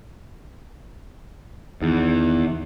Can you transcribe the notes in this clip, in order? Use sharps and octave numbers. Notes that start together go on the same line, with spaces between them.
E2 D#3